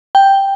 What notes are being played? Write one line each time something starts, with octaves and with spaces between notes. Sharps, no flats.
G5